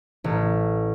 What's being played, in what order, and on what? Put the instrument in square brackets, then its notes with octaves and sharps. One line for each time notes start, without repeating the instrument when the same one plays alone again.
[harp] A1